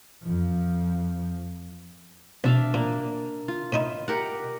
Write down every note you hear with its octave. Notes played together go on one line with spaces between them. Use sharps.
F2 F3
B1 D4 E5 F5
A#2 A#3
F4
A2 D#4 E4
G4 A#4 F#5